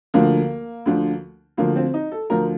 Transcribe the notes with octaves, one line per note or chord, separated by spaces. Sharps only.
D2 D3 F3 A#3
D2 D3 F3
D2 D3 F3 A#3
C4
D#4
A4
D2 D3 F3 A#4